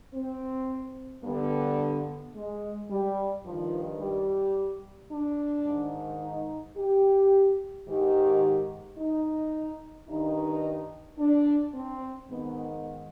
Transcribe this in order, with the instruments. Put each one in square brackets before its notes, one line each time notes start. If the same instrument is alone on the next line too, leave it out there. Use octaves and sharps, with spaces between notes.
[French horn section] C4
G2 D3 B3
G#3
G3
G2 D#3 F3
G3
D4
G#2 D#3
D#4
G4
G#2 D#3 G4
D#4
G2 D#3 D#4
D4
C4
G#2 D#3 B3